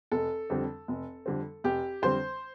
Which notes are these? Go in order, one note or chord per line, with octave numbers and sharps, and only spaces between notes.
F1 A4
F2 D3 G3 C4
F1
F2 D3 G3 C4
F1 G4
F2 D3 G3 C4 C5